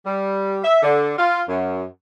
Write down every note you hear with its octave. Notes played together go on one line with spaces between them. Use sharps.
G3
E5
D3
F4
F#2